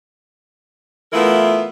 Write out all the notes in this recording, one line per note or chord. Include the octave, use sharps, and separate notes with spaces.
E3 A3 B3 E4 F4 A#4